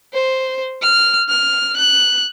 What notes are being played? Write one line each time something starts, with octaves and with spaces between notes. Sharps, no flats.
C5
F6
F6
F#6